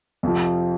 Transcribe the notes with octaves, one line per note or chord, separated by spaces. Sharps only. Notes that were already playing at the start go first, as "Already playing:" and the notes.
F2 C3 F3